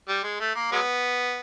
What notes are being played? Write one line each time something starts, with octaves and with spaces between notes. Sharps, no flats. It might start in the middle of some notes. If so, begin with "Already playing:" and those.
G3
G#3
A3
A#3
F#3 G#3 B3